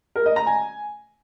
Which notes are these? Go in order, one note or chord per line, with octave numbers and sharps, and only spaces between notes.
A#4
D#5
A#5
G#5